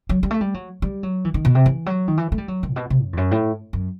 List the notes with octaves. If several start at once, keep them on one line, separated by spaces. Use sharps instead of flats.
F#3
G3
A3
G3
F#3
G3
F#3
E3
D#3
B2
C3
E3
F#3
D#3
E3
A3
G3
F#3
D#3
A2
B2
C3
F#2
E2
F#2
A2
F#2